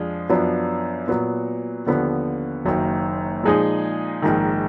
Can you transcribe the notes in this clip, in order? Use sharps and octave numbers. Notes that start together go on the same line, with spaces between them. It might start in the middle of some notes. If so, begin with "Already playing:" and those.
Already playing: F2 F3 G#3 D4
F#2 F3 B3 D4
A#2 F#3 B3
D#2 D3 F3 B3
F#1 F#2 D#3 A#3
A#2 F3 G#3 D#4 G#4
A#1 G#2 D#3